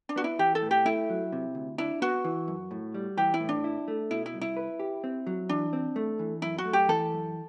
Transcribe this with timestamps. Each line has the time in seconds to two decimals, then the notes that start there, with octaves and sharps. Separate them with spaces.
0.09 D4
0.16 B3 F#4
0.24 E4
0.39 E3 G4
0.55 A4
0.63 A2
0.71 G4
0.85 A3 E4
1.10 F#3
1.33 C3
1.55 D2
1.78 D4 E4
2.02 B3 F#4
2.25 E3
2.48 F#2
2.71 A2
2.94 G3
3.17 E3 G4
3.34 E4
3.40 A2
3.49 D4
3.64 E4
3.88 A3
4.10 B2 E4
4.26 E4
4.34 C2
4.41 E4
4.57 B4
4.80 G4
5.04 C4
5.27 F#3
5.49 E3 D4
5.73 C4
5.96 A3
6.19 E3
6.42 F#2 E4
6.58 F#4
6.65 A3
6.73 G4
6.88 E3 A4
7.12 F#2